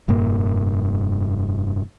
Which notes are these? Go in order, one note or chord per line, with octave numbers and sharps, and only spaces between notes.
F1 G2 A#2 A#3